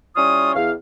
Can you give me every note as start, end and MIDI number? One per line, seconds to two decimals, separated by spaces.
0.16 0.53 55
0.16 0.53 61
0.16 0.53 64
0.16 0.53 65
0.16 0.53 73
0.16 0.53 87
0.56 0.72 40
0.56 0.72 77